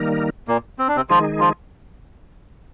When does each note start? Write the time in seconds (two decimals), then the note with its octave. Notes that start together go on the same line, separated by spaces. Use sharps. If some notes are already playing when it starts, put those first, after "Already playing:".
Already playing: D#3 G3 A#3 D#4 A#4
0.48 A#2 A#3
0.79 C4
0.88 D4
0.96 C3 C4
1.10 D#3 F3 G#3 D#4 F4 G#4
1.40 F3 F4